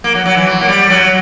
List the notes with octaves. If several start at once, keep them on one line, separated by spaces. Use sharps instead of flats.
A#3
F#3
F#3
E3
F#3
A#3
G3
F#3